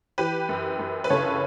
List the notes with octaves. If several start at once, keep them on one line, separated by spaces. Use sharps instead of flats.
E3 G4 B4
F#2
F#2
B4
C#3 A4 C#5